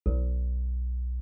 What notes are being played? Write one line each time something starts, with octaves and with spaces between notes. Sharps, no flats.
B1